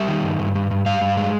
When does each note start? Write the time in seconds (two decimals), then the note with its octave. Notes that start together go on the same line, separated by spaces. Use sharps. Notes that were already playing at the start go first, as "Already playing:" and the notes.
Already playing: G3 E5
0.08 D#3
0.23 G2
0.39 G2
0.55 G2
0.71 G2
0.86 G2 F5
1.01 G2
1.17 G#3